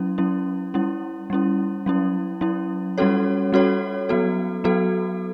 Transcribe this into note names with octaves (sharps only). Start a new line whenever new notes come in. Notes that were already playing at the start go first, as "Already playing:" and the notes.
Already playing: F#3 C#4 E4
F#3 C#4 E4
G3 C#4 E4
G3 C#4 E4
F#3 C#4 E4
F#3 C#4 E4
G3 C#4 F#4 A4 C#5
G3 C#4 F#4 A4 C#5
F#3 B3 F#4 A4
F#3 B3 F#4 A4